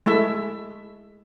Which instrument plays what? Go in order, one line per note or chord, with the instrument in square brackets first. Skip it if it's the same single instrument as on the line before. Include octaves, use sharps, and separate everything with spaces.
[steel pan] G#3 A3 E4 E5